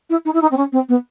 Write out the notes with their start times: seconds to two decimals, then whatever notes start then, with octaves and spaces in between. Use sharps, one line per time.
0.09 E4
0.25 D#4
0.33 E4
0.41 D#4
0.51 C4
0.57 C#4
0.72 C4
0.88 B3